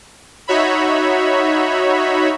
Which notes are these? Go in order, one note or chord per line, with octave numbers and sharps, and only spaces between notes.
D#4 F#4 C#5 E5 B5